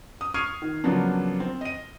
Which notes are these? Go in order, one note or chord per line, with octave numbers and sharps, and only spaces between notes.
D#6
C#6 D#6 F6 G#6 C7 D#7
D#3
C#3 F3 F#3 A#3 B3 D4
C4
D#5 D#7